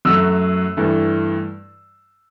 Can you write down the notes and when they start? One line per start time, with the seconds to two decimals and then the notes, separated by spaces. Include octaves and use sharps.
0.05 F#2 F#3 A3 E6
0.77 G2 E3 A3